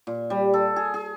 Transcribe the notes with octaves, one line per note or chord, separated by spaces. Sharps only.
A#2
G3
A4
G#4
G#4